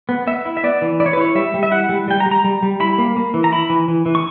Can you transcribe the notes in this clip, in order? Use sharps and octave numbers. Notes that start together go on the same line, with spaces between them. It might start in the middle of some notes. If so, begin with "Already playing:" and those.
B3
B3 E5
E4
E5
B3 D5
E3
E4 D5
C#5
B4
E4 C#5
G3 E5
G3
E5
E4 F#5
G3
G3 G5
A#5
G3
A#5
G3
G3
E4 B5
A#3
A#3
E3
A#5
E4 B5
E3
E3
E3
C#6